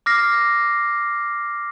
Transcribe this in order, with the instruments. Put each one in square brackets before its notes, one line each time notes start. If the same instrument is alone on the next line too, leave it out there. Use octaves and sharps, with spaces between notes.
[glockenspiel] D6 F6 A#6 C7